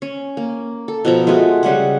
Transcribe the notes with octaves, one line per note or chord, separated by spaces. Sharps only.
C#4
A#3
A4
B2 F3 A#5
G#3 A3 F4 F#4
C#3 G3 G#3 F#5